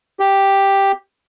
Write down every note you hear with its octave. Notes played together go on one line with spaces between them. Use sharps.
G4